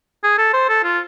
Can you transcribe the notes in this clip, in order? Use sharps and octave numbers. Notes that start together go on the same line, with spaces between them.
G#4
A4
C5
A4
F4